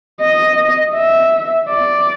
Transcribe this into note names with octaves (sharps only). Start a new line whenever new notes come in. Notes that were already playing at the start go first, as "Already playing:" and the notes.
D#5
E5
D5